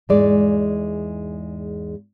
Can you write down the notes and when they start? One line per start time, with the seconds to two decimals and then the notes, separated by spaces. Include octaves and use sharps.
0.09 E2 G#2 G#3 D5